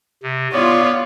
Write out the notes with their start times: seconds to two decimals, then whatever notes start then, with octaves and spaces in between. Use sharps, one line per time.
0.23 C3
0.53 B3 F4 C#5 D5